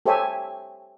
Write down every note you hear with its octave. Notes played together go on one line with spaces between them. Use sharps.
G4 A4 C5 C#5 E5 G#5